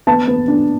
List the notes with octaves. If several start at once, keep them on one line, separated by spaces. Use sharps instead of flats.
B3 A5
B3
D4